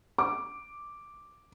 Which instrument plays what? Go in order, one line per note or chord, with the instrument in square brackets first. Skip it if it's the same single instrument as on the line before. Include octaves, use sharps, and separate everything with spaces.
[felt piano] D6